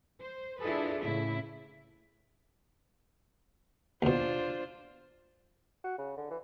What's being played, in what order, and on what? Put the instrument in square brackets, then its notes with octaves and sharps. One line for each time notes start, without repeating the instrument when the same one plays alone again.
[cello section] C5
D4 E4 F4 G#4 A4 B4
A2 C#3 E4
[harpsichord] D#2 B2 [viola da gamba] D4 F4 C5
[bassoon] F#4
C#3
D3
E3